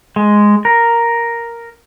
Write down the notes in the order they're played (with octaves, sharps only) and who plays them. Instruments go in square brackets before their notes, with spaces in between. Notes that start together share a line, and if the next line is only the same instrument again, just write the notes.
[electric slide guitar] G#3
A#4